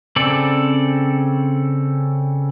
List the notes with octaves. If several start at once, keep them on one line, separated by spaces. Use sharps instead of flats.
C#3 C4 A4 D5